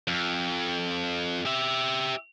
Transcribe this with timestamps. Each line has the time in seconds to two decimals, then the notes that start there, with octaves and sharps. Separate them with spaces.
0.07 F2
1.46 G4 E5